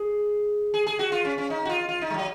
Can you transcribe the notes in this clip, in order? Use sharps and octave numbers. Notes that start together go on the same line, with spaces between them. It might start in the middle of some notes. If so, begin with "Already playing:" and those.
Already playing: G#4
G#4
G#4
F#4
F4
C#4
C#4
D#4
F#4
F4
F4
D#4
G#3
F#3